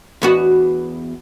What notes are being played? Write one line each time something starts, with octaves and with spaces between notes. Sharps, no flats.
E2 B3 F#4